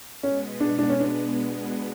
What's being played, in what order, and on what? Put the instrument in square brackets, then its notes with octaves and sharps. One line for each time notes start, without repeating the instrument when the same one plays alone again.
[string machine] B2 G#3 B3 [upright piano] C#4
[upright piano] D4
D4
C#4
[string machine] B2 G#3 B3 [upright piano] D4